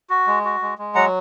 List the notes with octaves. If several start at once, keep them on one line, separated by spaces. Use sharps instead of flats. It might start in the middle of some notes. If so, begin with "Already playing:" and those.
F#4
G#3
F#4
G#3
G#3
F#3 F#5 A#5